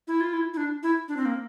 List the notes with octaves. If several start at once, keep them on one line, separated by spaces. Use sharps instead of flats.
E4
F4
E4
E4
D4
E4
D4
C4
A#3